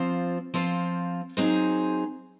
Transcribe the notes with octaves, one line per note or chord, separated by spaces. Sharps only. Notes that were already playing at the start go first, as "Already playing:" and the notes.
Already playing: F3 C4 F4 C5
F3 C4 F4 C5
F#3 C4 D#4 G#4 C5